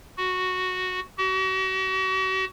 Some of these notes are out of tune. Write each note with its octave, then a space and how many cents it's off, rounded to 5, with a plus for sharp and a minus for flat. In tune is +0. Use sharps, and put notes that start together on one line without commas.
F#4 -5
F#4 +40